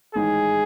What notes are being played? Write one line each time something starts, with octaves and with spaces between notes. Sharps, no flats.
A1 G#2 D#3 G#3 D#4 G#4